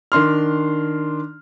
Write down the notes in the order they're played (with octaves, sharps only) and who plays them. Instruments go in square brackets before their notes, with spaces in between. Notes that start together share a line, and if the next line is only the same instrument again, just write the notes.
[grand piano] D#3 D4 C6 F6